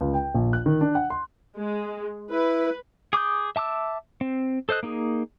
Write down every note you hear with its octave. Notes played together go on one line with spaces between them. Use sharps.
C#2
G5
A#1
F#6
D#3
D4
F#5
C6
G#3
E4 B4
G#4 D6 D#6 G6
E5 A5 D6 E6
C4
A4 C5 D#5 F#6
A#3 D#4 G#4